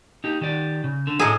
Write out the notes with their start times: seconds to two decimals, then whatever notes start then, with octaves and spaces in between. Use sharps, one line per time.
0.24 D#4 G4
0.41 D#3 G4 D5
0.84 C#3
1.07 D3
1.19 A2 G#4 A4 D#5 A#5